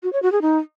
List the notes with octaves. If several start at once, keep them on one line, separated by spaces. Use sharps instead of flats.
F#4
C#5
F#4
G#4
D#4